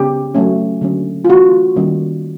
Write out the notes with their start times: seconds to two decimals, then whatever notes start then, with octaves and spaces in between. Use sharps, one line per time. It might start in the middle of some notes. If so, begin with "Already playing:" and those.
Already playing: C#3 B3 G4
0.35 F#3 A3 C#4
0.81 D3 F#3 A#3 C#4
1.25 F4
1.29 E3 A3 C#4 F#4
1.76 D#3 G3 A#3 C#4